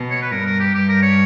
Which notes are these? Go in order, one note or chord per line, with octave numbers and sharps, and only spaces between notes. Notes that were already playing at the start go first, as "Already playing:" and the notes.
Already playing: B2
C#5
B4
G2 A#4
A#4
G4
G2 G4
A#4
C#5